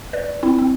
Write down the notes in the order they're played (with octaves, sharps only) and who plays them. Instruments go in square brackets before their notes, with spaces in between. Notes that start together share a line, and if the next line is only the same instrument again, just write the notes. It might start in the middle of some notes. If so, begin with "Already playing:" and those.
[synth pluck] B4 D5
C4 E4
C4